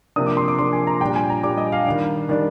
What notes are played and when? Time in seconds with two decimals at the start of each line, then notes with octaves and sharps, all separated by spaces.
0.16 C3 F3 A#3 D4 D#6
0.26 D6
0.37 C6
0.48 D6
0.59 C3 F3 A#3 D4 C6
0.73 G#5
0.87 A#5
1.01 A#2 G3 D4 G5
1.15 G#5
1.30 A#5
1.43 A#2 G3 D4 D6
1.57 D#5
1.72 F5
1.86 D#3 G3 D4
2.29 D#3 G3 D4